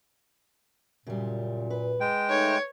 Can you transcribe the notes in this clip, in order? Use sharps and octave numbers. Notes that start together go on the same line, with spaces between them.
F#2 A#2 C#3 G3
B4
G#3 G5
A3 D#4 C#5